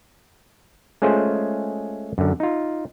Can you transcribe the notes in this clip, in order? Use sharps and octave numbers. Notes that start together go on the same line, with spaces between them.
G#3 A3 C#4 F4 G#4 C5
F#2 D3
D#4 F4